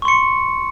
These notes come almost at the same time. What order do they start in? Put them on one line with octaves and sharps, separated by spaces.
C#6 C6 C#7